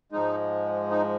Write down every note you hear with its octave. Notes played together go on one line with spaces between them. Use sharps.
G#2 F3 G#3 D#4
D#4